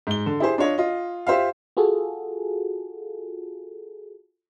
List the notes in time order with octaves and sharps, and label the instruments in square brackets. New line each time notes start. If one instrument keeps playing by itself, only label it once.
[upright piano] G#2 G7
D3
E4 G4 G#4 C5
D4 F4 C#5 D#5
F4 D#5
F4 G4 C5 E5 F5
[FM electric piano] F4 F#4 G#4 A4